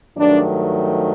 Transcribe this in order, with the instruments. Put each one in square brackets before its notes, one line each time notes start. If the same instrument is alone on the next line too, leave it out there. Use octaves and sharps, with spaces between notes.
[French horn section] G2 D#3 F#3 A3 D4